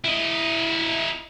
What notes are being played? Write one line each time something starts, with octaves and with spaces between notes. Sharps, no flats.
E4 D#5